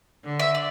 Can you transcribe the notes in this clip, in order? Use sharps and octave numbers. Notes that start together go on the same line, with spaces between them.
D3
E5
D5